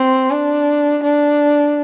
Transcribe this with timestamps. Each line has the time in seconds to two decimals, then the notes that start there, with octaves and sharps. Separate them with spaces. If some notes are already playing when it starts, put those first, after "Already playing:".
Already playing: C4
0.30 D4
1.03 D4